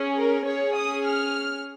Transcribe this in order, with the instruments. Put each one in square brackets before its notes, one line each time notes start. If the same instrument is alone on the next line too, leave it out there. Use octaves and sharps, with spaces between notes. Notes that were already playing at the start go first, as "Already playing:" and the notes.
Already playing: [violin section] C#4 G#4
A#4
C#4 G#4 C#5
D#6
F6